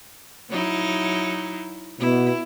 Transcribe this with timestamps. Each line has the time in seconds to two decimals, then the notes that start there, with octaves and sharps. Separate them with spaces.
0.50 F#3 D#4 E4
2.00 B2 E4